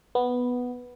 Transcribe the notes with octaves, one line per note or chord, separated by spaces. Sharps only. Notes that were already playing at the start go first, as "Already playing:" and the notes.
B3